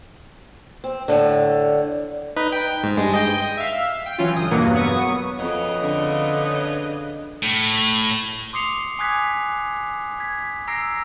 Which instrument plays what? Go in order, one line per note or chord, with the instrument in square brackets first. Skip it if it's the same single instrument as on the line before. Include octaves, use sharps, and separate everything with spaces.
[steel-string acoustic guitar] C4
A2 D3
[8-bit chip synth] D#4 B4
G5
G#2
G2 G#3
D#5 G5
[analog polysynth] E5 F5
G5
E3 F#3 C#4 F4
G1 D#6 G6
E2 G2 B2 F#3 A#3 B3
F#3 B3 C#6 D#6
[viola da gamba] F2 [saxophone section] C#3 B4 D#5
[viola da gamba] D3
[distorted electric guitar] A2
[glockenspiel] C6 D6 D#6 C7 C#7 F7
G#5 D6 D#6 F#6 G#6 B6
G#6 B6
A#5 E6 A#6 C7 D7